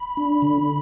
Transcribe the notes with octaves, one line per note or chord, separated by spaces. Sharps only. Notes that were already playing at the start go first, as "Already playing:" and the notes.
Already playing: B5
D4
D3